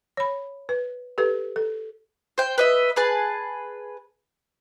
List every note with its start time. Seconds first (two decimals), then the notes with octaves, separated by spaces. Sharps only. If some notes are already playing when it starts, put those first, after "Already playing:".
0.17 C#5 B5
0.69 B4
1.18 G4 A4 B4
1.56 A4
2.38 C5 G5
2.58 B4 D#5 E5
2.96 G#4 B4 A5